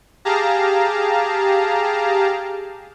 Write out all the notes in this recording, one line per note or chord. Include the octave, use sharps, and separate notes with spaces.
G4 G#4 F5 A5 A#5